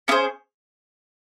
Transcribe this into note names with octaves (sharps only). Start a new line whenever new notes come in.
C#4 E4 G#4 C5